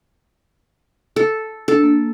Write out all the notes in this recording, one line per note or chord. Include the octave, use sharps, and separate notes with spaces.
A4
D4 A4
A#3